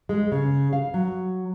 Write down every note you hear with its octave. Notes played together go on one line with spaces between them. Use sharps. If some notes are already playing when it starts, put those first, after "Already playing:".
G#3
C#3
F5
F#3